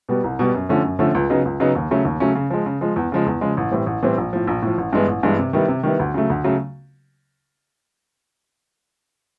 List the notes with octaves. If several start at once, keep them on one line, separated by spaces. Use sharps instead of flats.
B2 G3 B3
C2
B2 G3 B3
F#2
D3 F3 A3 C#4
F#2
D3 F3 A3 C#4
C#2
C#3 F#3 B3 D#4
C#2
C#3 F#3 B3 D#4
D#2
C#3 F#3 A3 C#4
D#2
C#3 F#3 A3 C#4
C#3
F3 G#3
C#3
F3 G#3
E2
C#3 F3 G#3
E2
C#3 F3 G#3
A1
A2 E3 G3 C4
A1
A2 E3 G3 C4
A#1
A2 F3
A#1
A2 F3
A1
G2 E3 G#3 B3
A1
G2 E3 G#3 B3
C3
D#3 G3 B3 E4
C3
D#3 G3 B3 E4
D2
C#3 F#3 A3
D2
C#3 F#3 A3